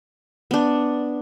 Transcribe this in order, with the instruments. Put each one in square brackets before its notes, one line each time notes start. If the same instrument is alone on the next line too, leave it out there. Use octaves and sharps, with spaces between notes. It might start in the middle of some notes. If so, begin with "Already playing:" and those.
[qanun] B3 D4